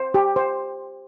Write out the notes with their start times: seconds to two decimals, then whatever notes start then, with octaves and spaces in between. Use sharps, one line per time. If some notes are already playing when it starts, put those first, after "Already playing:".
Already playing: C5
0.14 G4
0.36 C5